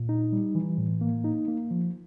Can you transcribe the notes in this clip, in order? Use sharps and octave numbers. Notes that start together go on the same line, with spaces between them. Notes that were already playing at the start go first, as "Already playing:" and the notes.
Already playing: A#2
D#4
G3
E3
A2
A#3
D#4
A#3
F3